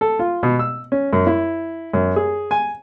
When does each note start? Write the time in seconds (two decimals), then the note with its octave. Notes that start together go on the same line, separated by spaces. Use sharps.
0.01 A4
0.19 F4
0.43 B2
0.59 E6
0.92 C#4
1.13 F#2
1.27 E4
1.94 F#2
2.16 G#4
2.51 G#5